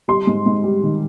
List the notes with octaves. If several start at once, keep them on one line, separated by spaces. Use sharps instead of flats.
G3 C6
G#2
G#2
G3
D#3